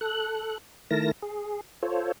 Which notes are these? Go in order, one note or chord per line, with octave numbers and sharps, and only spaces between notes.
A4 F#6
D#3 A3 E4 A#4 A5 A#6
G#4
F4 A4 C5 C#5